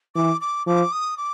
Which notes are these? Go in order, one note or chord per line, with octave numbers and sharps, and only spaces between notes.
E3 D6
D6
F3 D6
D#6
D6